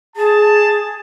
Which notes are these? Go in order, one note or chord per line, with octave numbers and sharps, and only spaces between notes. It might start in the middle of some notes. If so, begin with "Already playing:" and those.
G#4 A5